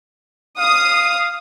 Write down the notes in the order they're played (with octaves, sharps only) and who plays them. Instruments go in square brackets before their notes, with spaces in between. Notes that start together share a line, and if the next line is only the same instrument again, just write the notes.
[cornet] F5 [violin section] D#6